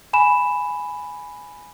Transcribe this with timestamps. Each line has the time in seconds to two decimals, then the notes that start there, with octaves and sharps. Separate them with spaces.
0.13 G#5 B5 E7